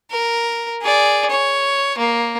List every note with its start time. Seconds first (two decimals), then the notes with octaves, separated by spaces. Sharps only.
0.11 A#4
0.82 G#4 D5
1.30 C#5
1.98 A#3